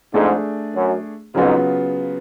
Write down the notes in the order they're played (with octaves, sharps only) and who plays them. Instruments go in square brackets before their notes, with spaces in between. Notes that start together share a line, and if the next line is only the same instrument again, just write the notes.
[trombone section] F2 G#2 [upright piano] A3 D4 G#4
[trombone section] F#2
[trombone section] F2 G#2 [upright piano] C#3 F#3 B3 F4